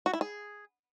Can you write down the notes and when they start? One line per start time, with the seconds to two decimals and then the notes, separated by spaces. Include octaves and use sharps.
0.06 F#4
0.13 E4
0.21 G#4